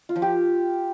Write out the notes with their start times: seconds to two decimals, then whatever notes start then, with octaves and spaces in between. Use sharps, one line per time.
0.09 F4
0.16 F3
0.22 G4